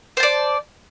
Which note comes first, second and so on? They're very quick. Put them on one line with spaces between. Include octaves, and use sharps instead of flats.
C5 A5 D5